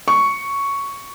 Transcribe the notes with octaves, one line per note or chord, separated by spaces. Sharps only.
C#6